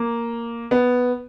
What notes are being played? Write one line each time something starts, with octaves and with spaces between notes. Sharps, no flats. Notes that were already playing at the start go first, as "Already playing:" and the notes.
Already playing: A#3
B3